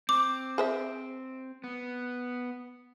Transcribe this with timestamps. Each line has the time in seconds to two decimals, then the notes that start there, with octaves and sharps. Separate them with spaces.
0.09 C4 D6
0.58 G#4 C5 E5
1.64 B3